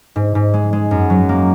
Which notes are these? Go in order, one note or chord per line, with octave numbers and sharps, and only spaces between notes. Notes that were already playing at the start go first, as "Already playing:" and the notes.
G#2
G#2
G#3
G#3
F#2
F#3
A#3